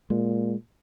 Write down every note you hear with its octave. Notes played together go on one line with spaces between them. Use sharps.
A#2 G#3